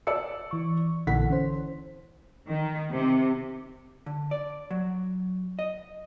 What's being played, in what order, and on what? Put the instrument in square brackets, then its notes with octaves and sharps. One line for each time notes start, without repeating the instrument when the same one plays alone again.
[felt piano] D5 E6 C#7
[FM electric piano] E3 C#6
[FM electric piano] A#1 A#2 F#5 [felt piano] D3 E3 B6
[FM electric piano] C#4 C5
[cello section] D#3
C3
[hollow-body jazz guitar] D3
D5
F#3
D#5